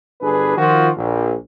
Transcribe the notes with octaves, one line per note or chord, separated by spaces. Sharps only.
G1 D4 G#4 B4
D#3 F3 F4 F#4
A#1